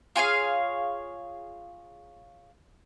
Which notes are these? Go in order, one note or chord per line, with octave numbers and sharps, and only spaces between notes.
F4 G#4 C#5 F5